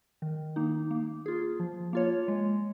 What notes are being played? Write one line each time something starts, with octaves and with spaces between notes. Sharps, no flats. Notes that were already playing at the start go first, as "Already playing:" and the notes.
D#3
A#3 D#4
A#3
F4 G#4
F3
A#3 F4 C#5
G#3